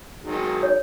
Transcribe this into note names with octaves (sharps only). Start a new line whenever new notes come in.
D#3 F#3 G#3
C#5